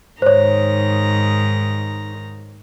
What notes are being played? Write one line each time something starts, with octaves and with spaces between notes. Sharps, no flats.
G#2 D#3 C5 C#5 A#5